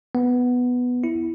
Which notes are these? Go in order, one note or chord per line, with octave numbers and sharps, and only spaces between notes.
B3
E4